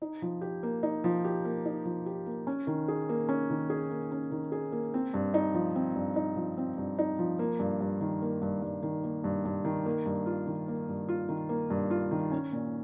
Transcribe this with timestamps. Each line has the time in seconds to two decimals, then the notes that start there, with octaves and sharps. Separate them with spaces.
0.02 D#4
0.22 F3
0.41 G4
0.63 A#3
0.83 D#4
1.04 F3
1.25 G4
1.45 A#3
1.66 D#4
1.85 F3
2.06 G4
2.26 A#3
2.47 C#4
2.67 D#3
2.88 G#4
3.09 A#3
3.29 C#4
3.50 D#3
3.70 G#4
3.91 A#3
4.12 C#4
4.31 D#3
4.52 G#4
4.72 A#3
4.94 C4
5.14 G2
5.34 D#4
5.54 F3
5.75 C4
5.95 G2
6.16 D#4
6.37 F3
6.58 C4
6.78 G2
6.99 D#4
7.19 F3
7.39 A#3
7.59 G2
7.81 G2
8.01 D#3
8.22 A#3
8.42 G2
8.62 G2
8.83 D#3
9.04 A#3
9.24 G2
9.45 G2
9.65 D#3
9.86 A#3
10.06 G2
10.26 F4
10.47 D#3
10.68 A#3
10.89 G2
11.09 F4
11.29 D#3
11.49 A#3
11.70 G2
11.91 F4
12.11 D#3
12.32 C#4
12.52 A#2